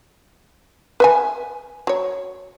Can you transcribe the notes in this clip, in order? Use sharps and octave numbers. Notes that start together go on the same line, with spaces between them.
B4 E5 G#5
F#3 C#5